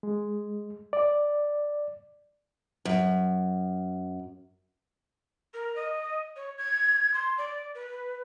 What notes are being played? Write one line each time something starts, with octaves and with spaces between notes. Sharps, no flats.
G#3
D5
F#2
A#4
D#5
C#5
G#6
C6
D5
B4